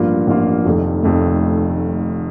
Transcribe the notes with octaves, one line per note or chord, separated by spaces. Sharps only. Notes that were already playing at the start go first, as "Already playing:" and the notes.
Already playing: A1 G2 F3 A#3 F4
A1 G2 F3 A#3 F4
F1 F2 D#3 A3
F1 F2 D#3 A3